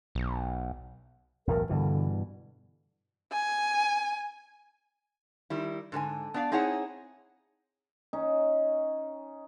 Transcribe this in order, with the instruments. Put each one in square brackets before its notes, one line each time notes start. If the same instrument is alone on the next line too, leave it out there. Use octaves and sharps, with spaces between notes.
[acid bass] B1
[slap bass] B1 E2 A2 [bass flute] A#4
[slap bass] G2 B2 E3 [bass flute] D3
[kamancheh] G#5
[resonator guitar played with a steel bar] D#3 G3 E4
G#2 D3 A4 G#5
B3 D4 D5 E5 F5
C4 D#4 E4 G#4 C#5 F#5
[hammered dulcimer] C#4 D#4